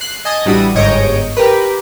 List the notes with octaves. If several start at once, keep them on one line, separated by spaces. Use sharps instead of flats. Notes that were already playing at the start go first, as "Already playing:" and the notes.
F#6 C7
D#5 G#5 A5 D#6
A1 G3 D4 E4 F#4 D#6
G1 G#2 C#5 D#5 G6 D7
G4 A#4 B4